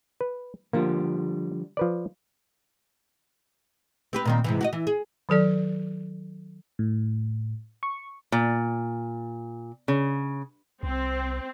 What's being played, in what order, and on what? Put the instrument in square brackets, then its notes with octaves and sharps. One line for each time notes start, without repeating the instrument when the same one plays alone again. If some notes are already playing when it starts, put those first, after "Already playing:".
[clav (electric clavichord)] B4
[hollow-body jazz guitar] D3 F3 G3 [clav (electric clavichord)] A#3
[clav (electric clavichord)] F3 B4 D5
[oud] C4 G4 B4
A#2 D#3 C4
G#2 C3 E3
F#4 G4 D#5
E3
G#4
[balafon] D#3 F#3 A4 D5
[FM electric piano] A2
C#6
[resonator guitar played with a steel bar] A#2
C#3
[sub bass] C2 [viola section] C4